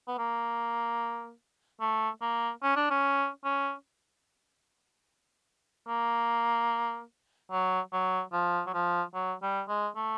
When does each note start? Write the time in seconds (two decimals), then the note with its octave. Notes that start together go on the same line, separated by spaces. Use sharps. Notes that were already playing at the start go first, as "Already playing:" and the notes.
0.08 B3
0.18 A#3
1.81 A3
2.21 A#3
2.63 C#4
2.76 D4
2.90 C#4
3.44 C#4
5.88 A#3
7.52 F#3
7.93 F#3
8.33 F3
8.67 F#3
8.74 F3
9.14 F#3
9.42 G3
9.69 G#3
9.96 A3